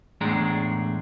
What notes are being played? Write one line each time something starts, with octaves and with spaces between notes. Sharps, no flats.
E2 A2 G#3 D4 A#5